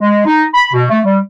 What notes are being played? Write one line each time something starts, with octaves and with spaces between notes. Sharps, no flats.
G#3
D#4
B5
B2
A3
G3